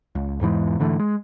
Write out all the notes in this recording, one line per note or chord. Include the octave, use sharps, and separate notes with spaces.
C#2
E2 G#2 E3 G#3
G#2 D3 E3 A3
G#3